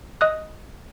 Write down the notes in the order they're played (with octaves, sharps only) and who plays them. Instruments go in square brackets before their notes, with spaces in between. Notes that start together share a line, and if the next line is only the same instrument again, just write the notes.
[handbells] D#5 D#6 F#6